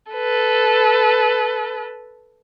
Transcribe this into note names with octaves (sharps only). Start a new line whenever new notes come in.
A4 B4